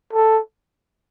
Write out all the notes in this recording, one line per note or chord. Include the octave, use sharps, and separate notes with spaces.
A4